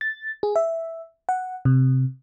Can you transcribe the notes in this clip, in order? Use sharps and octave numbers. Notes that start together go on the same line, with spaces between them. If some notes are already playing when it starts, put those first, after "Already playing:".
A6
G#4
E5
F#5
C3